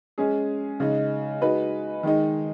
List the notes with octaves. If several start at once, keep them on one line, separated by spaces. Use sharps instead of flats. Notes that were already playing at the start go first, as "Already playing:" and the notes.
G#3 C#4 G#4
C#3 G#3 D#4
G#3 D#4 F#4 B4
D#3 G#3 D#4